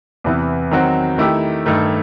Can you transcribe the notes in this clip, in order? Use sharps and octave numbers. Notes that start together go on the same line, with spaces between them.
E2 C3 E3 B3 E4
D#3 F#3 C4 F#4
D#3 A3 E4 G4
G2 D#3 A3